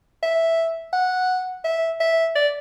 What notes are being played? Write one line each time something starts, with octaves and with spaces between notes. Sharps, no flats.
E5
F#5
E5
E5
D5